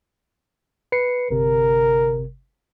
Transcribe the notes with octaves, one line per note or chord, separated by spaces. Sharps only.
B4 C7 C#7
G1 C3 A#4